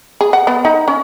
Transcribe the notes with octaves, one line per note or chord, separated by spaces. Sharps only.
G#4
F#5
B3
D#4
C#4